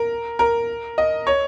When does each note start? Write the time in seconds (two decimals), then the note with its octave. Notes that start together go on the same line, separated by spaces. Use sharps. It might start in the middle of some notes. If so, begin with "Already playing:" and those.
Already playing: A#4
0.39 A#4
0.98 D#5
1.27 C#5